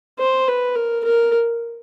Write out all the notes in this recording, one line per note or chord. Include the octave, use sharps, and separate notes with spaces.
C5
B4
A#4
A#4